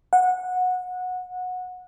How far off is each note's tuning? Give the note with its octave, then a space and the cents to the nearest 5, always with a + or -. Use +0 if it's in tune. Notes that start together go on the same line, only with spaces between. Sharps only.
F#5 -20